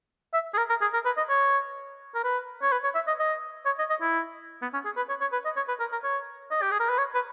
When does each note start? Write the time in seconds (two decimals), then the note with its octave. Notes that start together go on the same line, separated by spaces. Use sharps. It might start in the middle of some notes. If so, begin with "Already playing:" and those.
0.34 E5
0.54 G#4
0.58 A#4
0.69 A#4
0.82 G#4
0.94 A#4
1.05 B4
1.17 D#5
1.29 C#5
2.15 A#4
2.24 B4
2.63 C#5
2.72 B4
2.84 C#5
2.95 E5
3.07 D#5
3.20 D#5
3.66 C#5
3.79 D#5
3.90 D#5
4.02 E4
4.62 B3
4.74 C#4
4.85 G#4
4.96 B4
5.09 C#5
5.21 C#5
5.32 B4
5.45 D#5
5.56 C#5
5.68 B4
5.80 A#4
5.92 A#4
6.04 C#5
6.51 D#5
6.62 G4
6.71 G#4
6.80 A#4
6.89 B4
6.98 C#5
7.15 B4